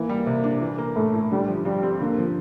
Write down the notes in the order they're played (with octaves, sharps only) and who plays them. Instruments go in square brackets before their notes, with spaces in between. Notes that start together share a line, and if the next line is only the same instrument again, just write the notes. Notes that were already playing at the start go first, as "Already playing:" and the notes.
Already playing: [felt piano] E3 E4 [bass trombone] A#3
[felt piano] G3
C3
D4
E3
A#3
[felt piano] A2 [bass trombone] A3
[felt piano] E4
[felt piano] D3 [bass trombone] G3
[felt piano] F3
[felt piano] G2 [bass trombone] G3
[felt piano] C4
[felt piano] D3 [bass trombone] A#3
[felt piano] F3